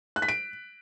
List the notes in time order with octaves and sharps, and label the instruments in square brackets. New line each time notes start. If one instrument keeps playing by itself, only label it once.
[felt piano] F#6
B6
D7